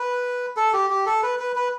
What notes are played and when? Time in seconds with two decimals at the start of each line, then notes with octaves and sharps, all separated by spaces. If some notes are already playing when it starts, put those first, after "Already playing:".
Already playing: B4
0.57 A4
0.73 G4
0.90 G4
1.06 A4
1.23 B4
1.39 B4
1.56 B4